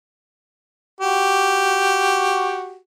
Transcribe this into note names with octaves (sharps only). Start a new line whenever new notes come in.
F#4 G4